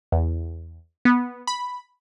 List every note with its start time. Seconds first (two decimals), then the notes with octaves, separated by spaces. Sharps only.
0.12 E2
1.05 B3
1.47 B5